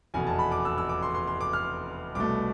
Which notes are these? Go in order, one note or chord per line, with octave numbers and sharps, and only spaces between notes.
F1 E2 B2 G#5
A5
B5
D6
E6
E6
D6
C6
C6
C6
D6
F6
C2 B2 A3 D6